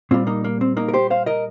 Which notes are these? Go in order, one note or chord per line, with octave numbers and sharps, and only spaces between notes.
A#2 G3 C4 F4
A#3 D#4
A#3
C4
A#3 D#4
A#4
G4 C5
C5 F5
A#4 D#5